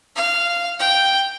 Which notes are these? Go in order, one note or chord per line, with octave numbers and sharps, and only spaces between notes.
F5
G5